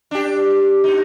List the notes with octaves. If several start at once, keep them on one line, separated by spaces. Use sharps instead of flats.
D4 G4
B2 D#4